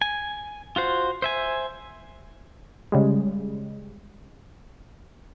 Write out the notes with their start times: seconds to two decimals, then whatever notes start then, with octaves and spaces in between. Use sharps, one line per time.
0.02 G#5
0.76 F4 F#4 C5
1.22 C5 E5 G#5
2.92 C#3 G3 G#3